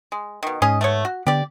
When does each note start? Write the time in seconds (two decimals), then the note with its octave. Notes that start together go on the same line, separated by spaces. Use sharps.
0.12 G#3
0.43 B2 D#3
0.62 G#2 C#4 G#4 D#5
0.81 A3 B3 C#5
1.05 F#4
1.26 D3 B3 G4 D5